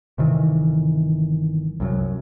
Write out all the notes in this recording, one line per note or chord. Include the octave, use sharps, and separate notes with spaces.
G1 C3 D#3 E3
C2 F#2 F#3